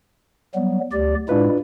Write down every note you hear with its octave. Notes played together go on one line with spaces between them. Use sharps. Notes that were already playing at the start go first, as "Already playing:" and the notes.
F#3 G3 B3
D2 G4 D5
A2 G#3 D4 E4 F4 B4